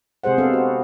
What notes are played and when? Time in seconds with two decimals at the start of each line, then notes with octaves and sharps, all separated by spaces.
0.24 C3 G#3 G#4 C5 F#5
0.38 B3 C4 D4 A4 F5
0.53 F#4